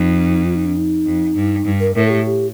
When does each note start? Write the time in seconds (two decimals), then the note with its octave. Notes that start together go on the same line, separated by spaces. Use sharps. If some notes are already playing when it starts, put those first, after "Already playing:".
Already playing: F2 D#4
0.45 F4
0.55 D#4
0.66 D4
0.77 D#4
1.05 F2
1.35 G2
1.65 G2
1.80 A#4
1.95 A2 A#4
2.06 A4
2.10 G4
2.26 G4